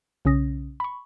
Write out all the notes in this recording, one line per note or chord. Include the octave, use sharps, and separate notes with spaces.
B1 C#3 C#4 D#6 A#6
B5 C#6